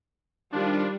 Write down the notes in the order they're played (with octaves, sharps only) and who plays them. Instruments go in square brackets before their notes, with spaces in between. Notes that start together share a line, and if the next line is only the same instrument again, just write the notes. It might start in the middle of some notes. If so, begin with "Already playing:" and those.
[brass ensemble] D#3 F3 F4 [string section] G3 [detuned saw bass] D4